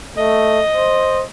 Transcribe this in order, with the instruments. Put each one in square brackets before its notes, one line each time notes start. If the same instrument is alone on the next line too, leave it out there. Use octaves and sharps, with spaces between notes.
[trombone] A3 [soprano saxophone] D#5
[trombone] C5